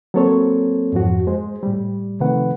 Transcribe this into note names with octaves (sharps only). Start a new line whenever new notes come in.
F#3 A#3 C4 A4 C5 C#5
F2 G#2 F3 F#4
G#3 C5
A2 G3
C3 D#3 F3 A3 B4 F#5